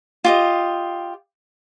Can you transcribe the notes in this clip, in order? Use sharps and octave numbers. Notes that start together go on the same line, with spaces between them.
F4 G4 D#5